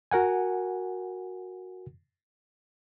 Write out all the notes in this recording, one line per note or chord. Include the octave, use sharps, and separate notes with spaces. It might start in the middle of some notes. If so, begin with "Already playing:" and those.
F#4 A#4 F#5 G#5